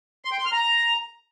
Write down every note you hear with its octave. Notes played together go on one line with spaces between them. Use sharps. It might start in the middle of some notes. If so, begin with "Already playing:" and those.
C6
G5
C6
F6
A#5